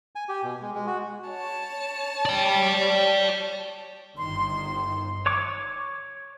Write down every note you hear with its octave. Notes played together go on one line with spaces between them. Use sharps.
G#5
G4
B2
G#3
G#3
F#4
C#5 A5
D5 G5
G1 D#3 C6
C#5 C#6 D6